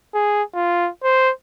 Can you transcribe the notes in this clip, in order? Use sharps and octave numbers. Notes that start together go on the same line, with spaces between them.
G#4
F4
C5